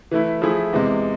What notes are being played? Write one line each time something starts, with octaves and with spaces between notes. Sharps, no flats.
E3 A3 E4
F3 A3 E4 G#4
E2 C3 G#3